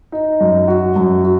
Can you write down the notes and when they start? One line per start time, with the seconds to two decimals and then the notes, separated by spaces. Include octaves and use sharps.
0.12 D#4
0.41 F#2
0.68 F#4
0.96 F#2
1.24 F#4